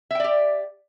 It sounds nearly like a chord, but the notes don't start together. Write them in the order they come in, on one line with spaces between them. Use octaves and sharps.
E5 G5 D5 G4